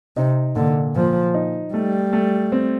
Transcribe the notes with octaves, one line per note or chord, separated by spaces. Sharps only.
C3 D#4
A#2 D3
A#2 F3
D#4
G3 A3
A3
C4